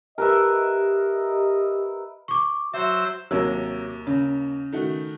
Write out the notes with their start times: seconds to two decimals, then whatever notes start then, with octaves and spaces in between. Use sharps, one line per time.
0.18 G4 A#4 B4 D#5 E5
2.28 C#6 D6
2.74 F#3 C5 E5 E6
3.31 D#2 C3 F#3 A#4 E6
4.07 C#3
4.72 D#3 A3 F#4